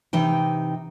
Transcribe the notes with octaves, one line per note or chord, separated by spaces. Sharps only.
C3 E3 D#4 G5